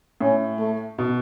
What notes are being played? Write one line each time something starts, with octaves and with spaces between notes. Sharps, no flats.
A2 C#4
A3
B2